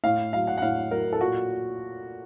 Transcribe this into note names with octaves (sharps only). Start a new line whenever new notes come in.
A2 F5
F#3 F5
F#5
F#5
A2 F5
F#3 A#4
A4
A#2 F#4